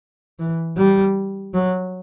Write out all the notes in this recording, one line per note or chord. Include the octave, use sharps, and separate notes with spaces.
E3
G3
F#3